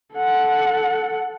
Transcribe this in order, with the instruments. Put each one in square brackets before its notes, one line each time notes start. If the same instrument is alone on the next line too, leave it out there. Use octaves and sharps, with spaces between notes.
[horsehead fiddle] A4 F#5